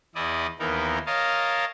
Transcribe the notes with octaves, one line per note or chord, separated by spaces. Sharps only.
E2 E4 D5 D#5
D#2 E3 B3 D#4 A#4
A#4 C#5 D#5 F5 A5